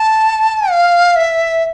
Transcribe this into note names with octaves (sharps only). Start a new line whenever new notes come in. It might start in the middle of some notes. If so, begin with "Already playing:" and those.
Already playing: A5
F5
E5